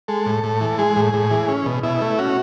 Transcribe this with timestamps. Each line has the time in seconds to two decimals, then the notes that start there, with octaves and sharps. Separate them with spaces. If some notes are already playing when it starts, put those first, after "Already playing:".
0.08 G#3 A4
0.26 A2
0.43 A2
0.61 E3
0.78 G#3 G#4
0.96 A2
1.14 A2
1.31 E3
1.48 C#4
1.66 B2
1.83 B2 E4
2.01 A3
2.19 C#4 F#4